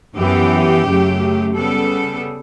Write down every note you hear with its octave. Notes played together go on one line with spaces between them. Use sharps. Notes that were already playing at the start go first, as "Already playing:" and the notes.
F#2 E3 B3 G4
F#2 C#3 F#3 A3
C#3 G3 B3 A4